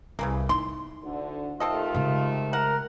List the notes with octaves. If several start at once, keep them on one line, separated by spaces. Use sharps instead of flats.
C2 C#3 E3 A#3
D#4 E4 C6
D2 D3
C3 D#3 A3 C4 F4 A4 D#5
C#3 G#3
A#4 F#5